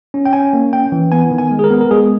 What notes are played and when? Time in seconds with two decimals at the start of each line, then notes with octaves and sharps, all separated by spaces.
0.14 C#4
0.26 G5
0.33 C#4 G#5
0.53 A#3
0.73 C#4 G5
0.92 E3
1.12 B3 G#5
1.31 D#3
1.38 G#5
1.51 G#3
1.59 G#4
1.64 A#4
1.70 B3
1.81 A#4
1.91 G#3 G#4